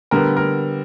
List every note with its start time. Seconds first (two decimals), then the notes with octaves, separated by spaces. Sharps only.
0.11 D3 G3 B3 A#4
0.37 A#4